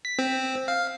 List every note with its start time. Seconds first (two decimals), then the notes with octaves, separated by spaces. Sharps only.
0.05 B6
0.19 C4
0.68 F5